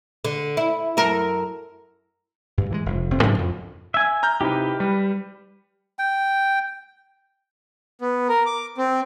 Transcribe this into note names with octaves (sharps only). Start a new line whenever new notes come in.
D3
E4
F#2 A4 A#4
D2 G2
E3 F#3 G#3
F1
F1 C4
G#2 C#3 F#3 D4
F2
E5 G#5
A#5 F6 G6
C3 D#4 E4 G4 B4
G3 B4
G5
B3
A#4
D6
C4